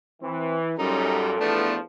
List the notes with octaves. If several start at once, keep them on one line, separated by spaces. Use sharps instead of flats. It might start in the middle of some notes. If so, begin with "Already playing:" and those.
E3 C4
F#2 A#2 G3 D#4 A4
E2 F3 A3 B3 D4